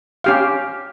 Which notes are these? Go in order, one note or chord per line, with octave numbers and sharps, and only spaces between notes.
C#4 G4 F5